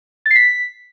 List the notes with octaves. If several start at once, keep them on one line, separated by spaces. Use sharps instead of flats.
A6
C7
B6